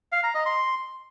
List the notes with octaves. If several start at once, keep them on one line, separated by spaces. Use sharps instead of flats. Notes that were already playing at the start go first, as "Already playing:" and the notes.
F5
A#5
D#5
C6